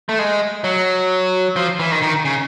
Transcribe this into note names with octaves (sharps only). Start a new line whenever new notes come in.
A3
G#3
F#3
F3
E3
D#3
D#3
C#3